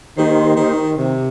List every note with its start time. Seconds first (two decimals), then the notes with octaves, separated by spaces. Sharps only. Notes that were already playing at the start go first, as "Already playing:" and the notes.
0.17 D#3 A#3 D#4 G4 C5
0.57 D#3
0.97 C3